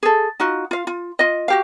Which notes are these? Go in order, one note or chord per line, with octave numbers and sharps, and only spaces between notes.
G#4 A4
D#4 F4 F#4
F4 F5
F4
F4 D#5
F#4 G4 F5